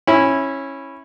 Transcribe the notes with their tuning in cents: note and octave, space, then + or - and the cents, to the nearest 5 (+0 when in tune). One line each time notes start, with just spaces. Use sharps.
C#4 -15 E4 -5